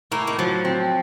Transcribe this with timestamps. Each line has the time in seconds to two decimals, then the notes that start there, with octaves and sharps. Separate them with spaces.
0.11 A2 A#3
0.27 D#3
0.38 F3 F#3
0.65 C4